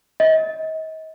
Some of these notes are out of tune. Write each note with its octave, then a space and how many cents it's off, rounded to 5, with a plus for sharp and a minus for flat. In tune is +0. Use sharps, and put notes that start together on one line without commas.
D#5 +35